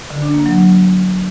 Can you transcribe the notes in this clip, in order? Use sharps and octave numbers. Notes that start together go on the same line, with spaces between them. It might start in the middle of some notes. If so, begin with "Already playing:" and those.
D3
D4
A#3
F#3
F#3